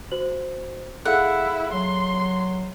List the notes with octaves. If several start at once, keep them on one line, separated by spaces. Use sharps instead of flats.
F#4 C5 F#7
E4 G#4 A4 F5 F#5
F#3 C6